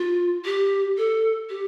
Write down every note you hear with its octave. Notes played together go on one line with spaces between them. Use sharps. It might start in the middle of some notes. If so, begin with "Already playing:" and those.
Already playing: F4
G4
A4
G4